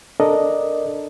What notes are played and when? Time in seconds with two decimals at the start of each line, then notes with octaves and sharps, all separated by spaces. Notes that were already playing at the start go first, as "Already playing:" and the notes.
0.20 D4 A4 A#4 D5 D#5